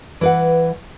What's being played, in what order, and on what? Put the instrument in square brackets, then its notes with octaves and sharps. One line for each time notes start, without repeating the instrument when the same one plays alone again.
[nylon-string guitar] E3 B4 F#5